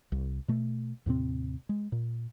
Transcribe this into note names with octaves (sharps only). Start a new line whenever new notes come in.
C2
B2 A3
D#2 A2 C3 C4
G#3
A#2